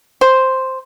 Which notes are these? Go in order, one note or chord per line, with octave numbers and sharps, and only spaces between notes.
C5